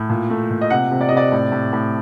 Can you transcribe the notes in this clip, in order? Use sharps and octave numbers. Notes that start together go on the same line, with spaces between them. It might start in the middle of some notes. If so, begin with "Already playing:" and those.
Already playing: A2
A#2
A3
A#2
D#5
C3 F#5
C3
D5
D#5
C3 D5
A2
A2
A2